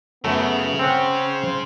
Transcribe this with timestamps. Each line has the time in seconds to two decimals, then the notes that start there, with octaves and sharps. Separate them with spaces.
0.24 F#2 C#3 A3 B3 A#5
0.79 C4 C#4 C5 F#5